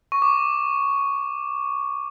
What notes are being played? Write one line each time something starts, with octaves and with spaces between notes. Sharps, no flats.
C#6
D6